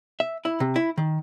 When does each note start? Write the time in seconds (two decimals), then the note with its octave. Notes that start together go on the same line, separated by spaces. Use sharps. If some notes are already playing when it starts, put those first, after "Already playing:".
0.20 E5
0.45 E4
0.60 C3
0.76 E4
0.98 D#3